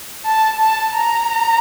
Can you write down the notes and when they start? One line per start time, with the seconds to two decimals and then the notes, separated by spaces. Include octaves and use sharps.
0.25 A5
0.60 A5
0.94 A#5